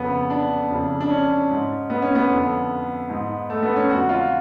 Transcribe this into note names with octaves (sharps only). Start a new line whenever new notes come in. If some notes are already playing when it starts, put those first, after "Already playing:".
Already playing: F2 C#3 B3
D4
F2 C#3
D4
C#4
G#2
B3
C#4
B3
F2 D3
G#2
A3
B3
C#4
F2 D3 F#4
F4